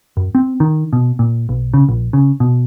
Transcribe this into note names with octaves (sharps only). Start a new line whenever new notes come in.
F#2
C4
D#3
B2
A#2
B1
C#3
A#1
C#3
B2